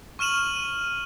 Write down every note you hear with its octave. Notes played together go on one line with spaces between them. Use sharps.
C#6 F6 D#7 E7 F#7